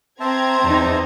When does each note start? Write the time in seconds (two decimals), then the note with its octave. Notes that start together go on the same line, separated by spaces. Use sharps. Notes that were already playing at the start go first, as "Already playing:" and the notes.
0.20 C4 C5 E5 A5 A#5 C6 G#6
0.64 E2 E3 D#4